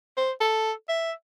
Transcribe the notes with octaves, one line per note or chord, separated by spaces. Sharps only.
C5
A4
E5